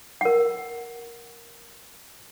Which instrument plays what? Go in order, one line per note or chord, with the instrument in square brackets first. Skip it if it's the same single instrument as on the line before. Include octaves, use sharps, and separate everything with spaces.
[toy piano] A#4 F#5